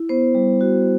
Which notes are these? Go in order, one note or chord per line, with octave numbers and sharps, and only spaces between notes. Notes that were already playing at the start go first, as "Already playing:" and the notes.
Already playing: E4
B3 C5
G3
F#4